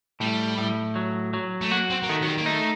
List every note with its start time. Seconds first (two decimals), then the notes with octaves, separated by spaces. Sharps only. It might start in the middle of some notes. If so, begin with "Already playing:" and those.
0.20 A2 G3
0.58 A2
0.96 F#3
1.34 F#3
1.61 A3
1.71 A#3 F#4
1.90 C4
2.03 A#3
2.09 D#3 A3
2.22 F#3
2.28 G3
2.38 A#3
2.46 A3 D#4